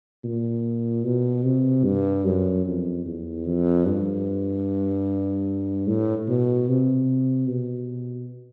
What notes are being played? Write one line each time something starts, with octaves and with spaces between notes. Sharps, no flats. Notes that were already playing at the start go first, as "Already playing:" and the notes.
A#2
B2
C3
G2
F#2
F2
E2
F2
G2
A2
B2
C3
B2